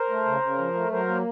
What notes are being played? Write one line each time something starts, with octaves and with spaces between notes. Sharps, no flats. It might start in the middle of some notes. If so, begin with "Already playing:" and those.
Already playing: A#4 C5
A3
C#3
C#3
F3
A3
F#3 A#4 C5
A#3